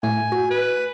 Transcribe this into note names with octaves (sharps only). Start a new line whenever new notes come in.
A2 A3 G#5
F#4
B4